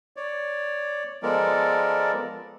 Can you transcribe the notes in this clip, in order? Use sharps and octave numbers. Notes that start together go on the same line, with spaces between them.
C#5 D5
F3 G#3 B3 A4 A#4 D5